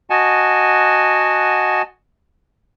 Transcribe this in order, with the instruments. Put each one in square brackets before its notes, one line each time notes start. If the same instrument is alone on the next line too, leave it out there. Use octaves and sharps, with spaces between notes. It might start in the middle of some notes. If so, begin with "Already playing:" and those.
[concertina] F#4 D#5 F#5 G#5 A5